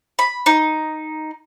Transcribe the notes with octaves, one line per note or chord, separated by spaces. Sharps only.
B5
D#4